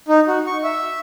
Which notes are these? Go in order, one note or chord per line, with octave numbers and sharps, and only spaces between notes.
D#4
F#4
C#6
E5